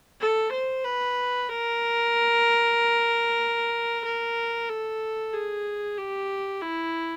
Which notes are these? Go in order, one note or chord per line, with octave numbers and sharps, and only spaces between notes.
A4
C5
B4
A#4
A#4
A4
G#4
G4
E4